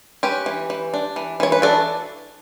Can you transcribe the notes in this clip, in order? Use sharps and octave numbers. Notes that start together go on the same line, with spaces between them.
C#4 G4 B4
E3
E3
D4
E3
E3 C#5
B4
D4 F#4 A4